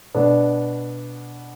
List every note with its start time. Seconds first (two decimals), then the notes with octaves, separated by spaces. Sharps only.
0.15 B2 B3 D4